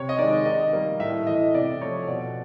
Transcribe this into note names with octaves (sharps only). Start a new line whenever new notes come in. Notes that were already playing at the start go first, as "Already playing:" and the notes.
Already playing: C3 C#5
D#5
D#3 G#3 D5
D#3 D#5
G3 A#3
A2 E5
E3 A3 D#5
C3 D5
F3 A3 C#5
B2 D5